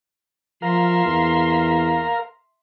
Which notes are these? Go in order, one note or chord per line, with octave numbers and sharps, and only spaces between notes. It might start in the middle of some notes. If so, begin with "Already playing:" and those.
F3 A#4 E5 F5 C6
E2